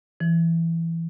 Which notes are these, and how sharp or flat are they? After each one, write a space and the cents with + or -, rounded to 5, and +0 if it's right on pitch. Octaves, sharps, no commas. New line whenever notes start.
E3 +10